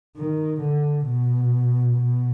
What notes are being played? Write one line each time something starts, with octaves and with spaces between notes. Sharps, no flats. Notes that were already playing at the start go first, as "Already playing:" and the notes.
D#3
D3
B2
B2